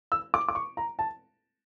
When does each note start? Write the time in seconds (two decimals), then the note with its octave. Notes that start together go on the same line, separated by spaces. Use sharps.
0.12 E6
0.34 D6
0.48 D6
0.55 C#6
0.77 A#5
0.99 A5